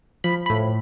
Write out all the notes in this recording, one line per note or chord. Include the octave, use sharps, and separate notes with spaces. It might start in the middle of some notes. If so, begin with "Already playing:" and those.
F3 B5
A2 B5